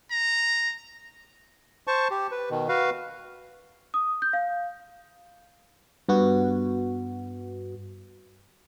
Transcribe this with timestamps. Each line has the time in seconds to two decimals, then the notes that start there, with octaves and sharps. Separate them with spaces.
0.11 A#5
1.87 C5 A5 C#6
2.11 G4
2.31 B4
2.50 B2 D#3
2.69 F#4 B4 F5
3.94 D#6
4.22 G6
4.33 F5
6.08 G2 B3 F#4